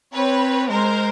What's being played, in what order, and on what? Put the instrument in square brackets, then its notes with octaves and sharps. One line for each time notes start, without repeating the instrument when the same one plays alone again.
[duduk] C4 [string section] B4 C#5
[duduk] G#3 [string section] A#4 C5